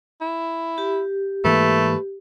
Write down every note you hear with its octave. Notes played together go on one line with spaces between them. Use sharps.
E4
G4
G#2 E3 A3 A#3 B4